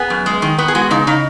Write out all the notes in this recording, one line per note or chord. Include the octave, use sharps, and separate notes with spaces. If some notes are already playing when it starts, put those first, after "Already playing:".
Already playing: B3 G#4
F#2
G#3
D#3
B3
G#4
G#3 F#4
C#3 D#4
C#3 D#4